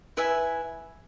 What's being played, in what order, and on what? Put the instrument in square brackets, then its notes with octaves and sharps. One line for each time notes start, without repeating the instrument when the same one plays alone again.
[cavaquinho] E4 B4 E5 G#5